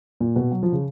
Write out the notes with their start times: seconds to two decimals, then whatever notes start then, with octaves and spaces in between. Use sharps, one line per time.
0.20 A#2
0.36 B2
0.52 F#3
0.63 F3
0.73 C#3